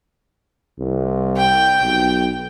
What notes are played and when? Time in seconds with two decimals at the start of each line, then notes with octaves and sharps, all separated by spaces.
0.80 C2
1.37 G5
1.82 B1